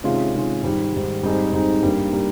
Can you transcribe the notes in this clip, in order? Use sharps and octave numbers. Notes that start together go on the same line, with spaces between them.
C3 D#3 G#3 C#4 F4
C3 D#3 G#3 C#4 F4
G#2 D#3 G3
G#2 D#3 G3
G#2 G3 C4 D#4 G#4
G#2 G3 C4 D#4 G#4
G2 G3 A#3
G3 A#3